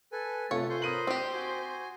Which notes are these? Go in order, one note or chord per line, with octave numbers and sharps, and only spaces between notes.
A4 B4 G#5
C3 A3 F4 A4 B4 C#5
C5 G#5
A#4 B5 D#6 F#6 D#7 F#7
C4 G4 G5 D6
F#4 G#5